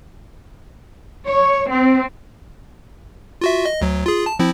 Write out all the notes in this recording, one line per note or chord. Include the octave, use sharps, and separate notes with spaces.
C#5
C4
F4 F#4 E5
D#5
D2 F#3
F4 G#4
A5
F3 C4 E4